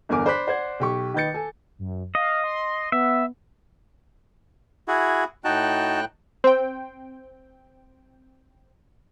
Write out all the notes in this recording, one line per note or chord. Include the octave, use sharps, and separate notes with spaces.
G1 E2 A#4 G#5 D6
C5 D5 B5 D6 F#6 B6
C5 D5 F#5 G#6
B1 G4 C#6
D#3 D#4 B4 G6 A6 C#7
A4 G#5
F#2
D#5 F5
C6
B3 E5
E4 F#4 G#4
A2 D#4 F#4 G5 A5 F#6
C4 G5